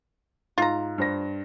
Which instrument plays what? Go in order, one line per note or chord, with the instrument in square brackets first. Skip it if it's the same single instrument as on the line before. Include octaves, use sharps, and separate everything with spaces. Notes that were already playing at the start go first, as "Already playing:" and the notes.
[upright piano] G#2 [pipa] F4 A#5
[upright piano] G2 C5 A#6